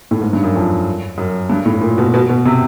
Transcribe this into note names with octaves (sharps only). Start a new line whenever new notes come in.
A2
G#2
G2
F#2
F2
F#2
G2
A2
A#2
B2
B2
B2
C3